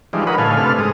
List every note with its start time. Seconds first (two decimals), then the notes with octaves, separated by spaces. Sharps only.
0.13 E3 F3 G3 G#3 D4 D#4
0.27 A#4 B4 C#5 D#5 F#5 B5
0.38 A2 D3 A4 F5 G#5
0.57 C3 A3 D4 A4 B4 F6
0.79 G#2 G#3 D#6